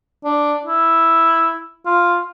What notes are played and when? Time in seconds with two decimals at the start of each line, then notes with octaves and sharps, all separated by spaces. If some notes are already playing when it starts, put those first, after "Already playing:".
0.25 D4
0.65 E4
1.86 F4